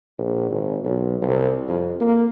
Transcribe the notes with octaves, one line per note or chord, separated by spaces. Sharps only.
A#1
G#1
B1
C2
F2
A#3